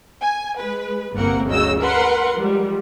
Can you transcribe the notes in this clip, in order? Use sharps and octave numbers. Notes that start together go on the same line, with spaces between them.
G#5
G#3 B4
G1 C2 A#3 C4 A#4 F#5
D2 C#3 F#3 D#5 E6
A#4 B4 F#5 C6
F3 G3 G#3